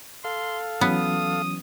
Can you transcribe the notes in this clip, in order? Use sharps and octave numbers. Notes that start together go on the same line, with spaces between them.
A4 F5 C6
E3 F#3 B3 C#4 D#6